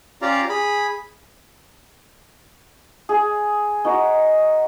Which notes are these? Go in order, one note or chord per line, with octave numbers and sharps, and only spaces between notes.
C#4 F4 G4 D5 F5 A#5
G#4 B5
G#4
D#4 F#4